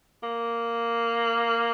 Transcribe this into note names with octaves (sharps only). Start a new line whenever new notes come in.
A#3